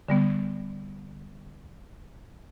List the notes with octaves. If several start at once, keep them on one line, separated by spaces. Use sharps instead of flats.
D3 G3 B3